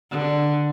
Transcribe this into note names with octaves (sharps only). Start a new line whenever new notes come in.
D3